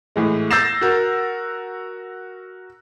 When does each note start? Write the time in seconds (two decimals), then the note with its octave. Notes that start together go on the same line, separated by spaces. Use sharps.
0.16 A2 E3 G#3
0.51 E6 G6 A6 A#6 C7 E7
0.81 F#4 A#4